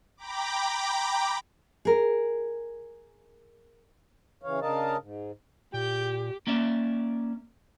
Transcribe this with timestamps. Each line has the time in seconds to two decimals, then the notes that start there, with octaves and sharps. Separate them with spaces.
0.17 G5 A#5 B5 D6
1.85 G#4 A#4
4.42 C#3 E3 C#5 F5
4.61 C#3 D4 A#4 D#5 F5 A5
5.00 G#2
5.74 A#2 G4 G5
6.47 A#3 C#4 D5 E5